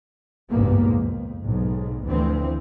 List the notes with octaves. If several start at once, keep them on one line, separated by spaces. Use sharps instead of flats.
G#1 C#2 G2 A#2 A#3 B3
F2
B1 G#2
D2 E3 F3 C4